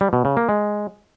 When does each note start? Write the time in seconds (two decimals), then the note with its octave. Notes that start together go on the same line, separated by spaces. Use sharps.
0.01 G3
0.13 B2
0.25 C#3
0.37 A#3
0.49 G#3